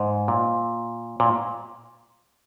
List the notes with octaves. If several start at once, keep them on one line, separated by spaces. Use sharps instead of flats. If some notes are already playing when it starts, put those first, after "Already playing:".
Already playing: G#2
A#2
A#2